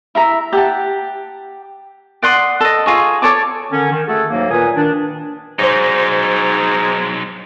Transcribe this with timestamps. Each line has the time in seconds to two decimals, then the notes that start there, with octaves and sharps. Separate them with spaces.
0.15 E4 E5 A#5
0.53 G4 F#5 A5
2.23 D5 F#5 C6 D#6
2.60 A4 D#5
2.86 F4 G#4 C#5
3.22 A4 C#5 D5 D6
3.73 D3 D#3 C#4
3.91 D#3
4.08 A3 F#4 G#4 A4
4.30 D2 G#2 F#3 A#3
4.50 A#2 D#3 B4 G#5 D#6
4.76 D#3 D4
5.59 G#2 F#3 D#4 C5 D5